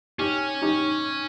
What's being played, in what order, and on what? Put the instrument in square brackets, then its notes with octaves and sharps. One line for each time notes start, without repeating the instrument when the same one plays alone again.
[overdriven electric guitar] C#4 [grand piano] D#4 G4
[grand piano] D#4 G4